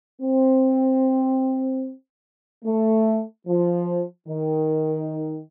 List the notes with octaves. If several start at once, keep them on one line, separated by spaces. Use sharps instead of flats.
C4
A3
F3
D#3